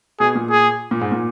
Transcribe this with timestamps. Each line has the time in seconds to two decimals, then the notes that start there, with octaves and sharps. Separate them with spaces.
0.20 B2 G#4
0.35 A#2
0.50 G#4
0.91 A#2
1.01 G#2
1.12 A#2